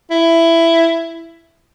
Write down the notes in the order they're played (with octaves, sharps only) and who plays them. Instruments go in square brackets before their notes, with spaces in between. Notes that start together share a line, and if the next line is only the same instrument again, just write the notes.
[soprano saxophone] E4